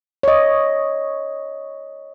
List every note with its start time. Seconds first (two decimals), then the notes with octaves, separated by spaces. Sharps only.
0.23 C#5 D#5